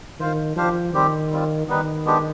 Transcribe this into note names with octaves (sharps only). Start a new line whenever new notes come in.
D#3 F4 C5 F5
F3 D4 G4 C5 F5
D#3 G3 C4 G4
G3 C4 F4
D#3 G3 B3 D#4 B4
G#3 B3 D4 G4